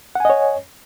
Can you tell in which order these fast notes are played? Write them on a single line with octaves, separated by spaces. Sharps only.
F#5 G#5 D#5 C#5